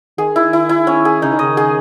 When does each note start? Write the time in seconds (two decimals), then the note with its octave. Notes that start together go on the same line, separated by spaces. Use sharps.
0.17 D#3 G#4
0.36 E4
0.53 E4
0.69 E4
0.87 C#4
1.05 G#4
1.22 C#3 D#4
1.31 D#3
1.39 C#3 D#5
1.57 G#4